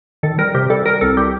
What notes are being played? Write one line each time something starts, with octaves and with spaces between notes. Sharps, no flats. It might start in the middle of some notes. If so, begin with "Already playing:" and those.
D#3 A4
G3 A#4
C3 G4
G3 A4
G3 A#4
C2 A4
G3 G4